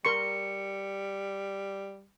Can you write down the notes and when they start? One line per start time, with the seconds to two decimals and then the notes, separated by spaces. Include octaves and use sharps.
0.05 G3 A#4 C6 C#6 C#7